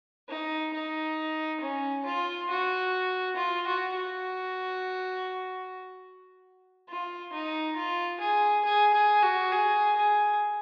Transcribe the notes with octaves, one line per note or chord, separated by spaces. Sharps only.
D#4
D#4
C#4
F4
F#4
F4
F#4
F#4
F4
D#4
F4
G#4
G#4
G#4
F#4
G#4
G#4